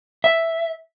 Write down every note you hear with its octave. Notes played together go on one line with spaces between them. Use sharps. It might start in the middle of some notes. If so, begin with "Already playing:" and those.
E5